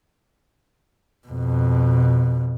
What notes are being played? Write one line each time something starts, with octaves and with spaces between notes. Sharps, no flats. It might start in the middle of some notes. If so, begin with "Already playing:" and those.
F2 B2